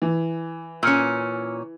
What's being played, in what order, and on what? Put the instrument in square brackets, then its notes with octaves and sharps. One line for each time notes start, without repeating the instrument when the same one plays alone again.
[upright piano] E3
[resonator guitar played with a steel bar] A#2 C#4 [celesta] E6 F6 C#7